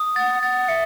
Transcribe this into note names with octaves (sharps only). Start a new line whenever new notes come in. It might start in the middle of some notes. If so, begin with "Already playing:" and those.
Already playing: D#6
F#5 A6
F#5 A6
E5 C#7